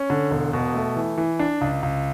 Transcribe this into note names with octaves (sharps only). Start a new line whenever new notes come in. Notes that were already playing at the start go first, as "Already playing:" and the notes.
Already playing: C#4
D3
E1
B2
A3
E3
E3
D4
C#2
C#2